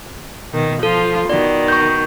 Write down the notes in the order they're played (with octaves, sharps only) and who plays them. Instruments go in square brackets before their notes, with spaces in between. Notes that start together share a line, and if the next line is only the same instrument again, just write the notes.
[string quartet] B2 D#3
[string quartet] F3 F4 [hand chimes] A4
[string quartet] B2 D#3 [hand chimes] D5
[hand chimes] C#6 G6